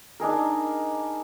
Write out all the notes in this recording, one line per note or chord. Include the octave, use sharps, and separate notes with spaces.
D4 D#4 G#4 A#4